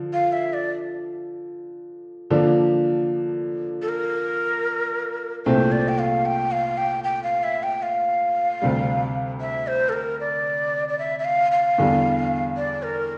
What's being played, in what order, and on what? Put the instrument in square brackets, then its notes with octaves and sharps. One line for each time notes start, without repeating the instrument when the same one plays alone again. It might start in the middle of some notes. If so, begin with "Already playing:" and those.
Already playing: [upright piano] D3 F3
[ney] F5
E5
D5
[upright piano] D3 F3 A#3 D4
[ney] A4
A#4
[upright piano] C2 A#2 A3 C4 [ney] C5
[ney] D5
G5
F5
G5
F5
G5
G5
F5
E5
G5
F5
[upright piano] D2 C3 G3
[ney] E5
C5
A4
A#4
D5
D5
E5
E5
F5
F5
[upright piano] E2 D3 G3
[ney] D5
A#4